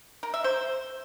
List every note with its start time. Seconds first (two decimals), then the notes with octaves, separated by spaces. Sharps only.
0.23 A#4
0.34 E5
0.44 C5